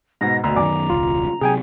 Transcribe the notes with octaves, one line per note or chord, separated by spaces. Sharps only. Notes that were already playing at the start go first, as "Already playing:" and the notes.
G#2 B2 A#6
D2 B2 A#5
F#2 D#3 D5 G#5 D6
E1 C#2 F4
C3 F#3 G#4 G5 G#5